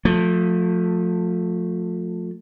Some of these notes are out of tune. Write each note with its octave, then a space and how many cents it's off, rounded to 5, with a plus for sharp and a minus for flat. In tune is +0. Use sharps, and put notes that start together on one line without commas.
F3 +35 A3 +10